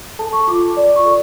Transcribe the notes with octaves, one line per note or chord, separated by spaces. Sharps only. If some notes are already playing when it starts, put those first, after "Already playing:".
A4 A5
C#6
F4 D6
D5
C#6
A4